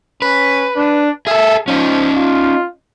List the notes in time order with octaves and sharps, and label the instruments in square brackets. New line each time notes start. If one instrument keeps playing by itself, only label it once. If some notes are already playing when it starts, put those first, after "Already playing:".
[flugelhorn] C#4 [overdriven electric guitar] B4
[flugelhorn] D4
[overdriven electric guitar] G#4 A4 [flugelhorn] E5
[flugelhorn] F3 [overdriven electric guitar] C#4 D#4
[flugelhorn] F4